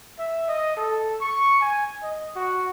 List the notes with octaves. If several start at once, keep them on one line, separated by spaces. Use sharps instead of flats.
E5
D#5
A4
C#6
G#5
D#5
F#4